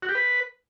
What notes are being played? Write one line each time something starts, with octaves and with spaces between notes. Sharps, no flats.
F#4
G4
B4